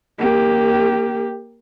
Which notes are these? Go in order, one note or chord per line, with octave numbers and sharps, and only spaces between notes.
A#3 G4